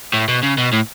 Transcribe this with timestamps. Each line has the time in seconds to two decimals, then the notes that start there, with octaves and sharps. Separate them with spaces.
0.13 A2
0.28 B2
0.43 C#3
0.58 B2
0.72 A2